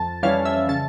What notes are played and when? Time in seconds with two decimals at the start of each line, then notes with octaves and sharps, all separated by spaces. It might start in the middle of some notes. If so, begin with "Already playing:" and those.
Already playing: F2 A5
0.23 E3 G3 C#4 F5
0.45 E5
0.69 C#3 A5